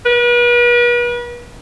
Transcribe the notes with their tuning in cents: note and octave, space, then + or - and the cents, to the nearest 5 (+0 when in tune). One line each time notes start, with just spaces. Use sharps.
B4 -40